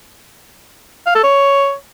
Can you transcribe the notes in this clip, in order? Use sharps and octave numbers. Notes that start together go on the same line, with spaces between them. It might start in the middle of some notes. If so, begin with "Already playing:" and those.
F5
A4
C#5